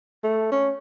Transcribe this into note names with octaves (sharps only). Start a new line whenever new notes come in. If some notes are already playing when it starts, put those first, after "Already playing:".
A3
C#4